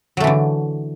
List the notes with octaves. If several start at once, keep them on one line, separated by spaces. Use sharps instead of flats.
D3 E3 F#3 A3